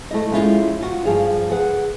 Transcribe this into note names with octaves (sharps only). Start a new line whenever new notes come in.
A3 E4 D#5
F3 G#3 C#4 E4 F4
F4 F#4
G2 F3 G3 G#4 F5
G#4 B4 F#5